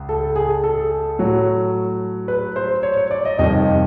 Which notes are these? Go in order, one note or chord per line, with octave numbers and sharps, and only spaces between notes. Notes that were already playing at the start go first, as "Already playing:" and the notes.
Already playing: C#2
A4
G#4
A4
A2 F#3
B4
C5
C#5
C#5
D5
D#5
F2 C3 D#3 G3 D#5